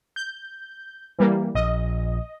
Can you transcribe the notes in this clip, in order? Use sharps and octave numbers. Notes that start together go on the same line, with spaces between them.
G6
E3 G3 A#3
A#1 D#5